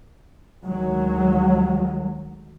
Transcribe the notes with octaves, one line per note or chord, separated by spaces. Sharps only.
D2 D#3 F#3 G#3